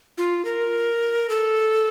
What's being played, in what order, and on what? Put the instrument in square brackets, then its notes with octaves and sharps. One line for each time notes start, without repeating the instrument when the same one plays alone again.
[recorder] F4
A#4
A4